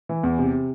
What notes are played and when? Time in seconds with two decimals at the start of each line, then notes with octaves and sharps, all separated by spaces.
0.09 E3
0.23 E2
0.39 C3